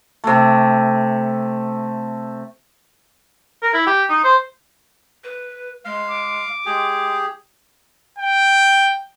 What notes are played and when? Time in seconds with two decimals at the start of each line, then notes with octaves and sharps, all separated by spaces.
0.24 C3 A3
3.62 A#4
3.74 E4
3.87 G4
4.10 D#4
4.24 C5
5.24 B4
5.85 G#3 F5
6.08 D6
6.66 G#3 G4 G#4
8.18 G5